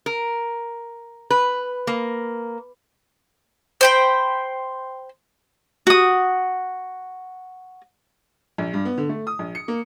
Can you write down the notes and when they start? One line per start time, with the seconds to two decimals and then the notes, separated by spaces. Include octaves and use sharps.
0.06 A#4
1.30 B4
1.87 A#3
3.81 C5 G5 B5
5.87 F#4 D#6
8.58 A#1
8.73 G2
8.85 B3
8.98 D3
9.09 A3
9.27 D#6
9.39 A#1
9.55 C#7
9.68 A#3